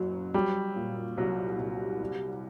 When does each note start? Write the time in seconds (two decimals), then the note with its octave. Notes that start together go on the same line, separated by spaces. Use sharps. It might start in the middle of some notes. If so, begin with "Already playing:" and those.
Already playing: F#1 F#2 F#3
0.34 F#3 G3
0.76 A#2
1.17 C2 F#3
1.59 C2
2.01 G3